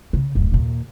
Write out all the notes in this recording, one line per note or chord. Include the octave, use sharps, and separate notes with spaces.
C#3
D1 F#2
D#2 A#2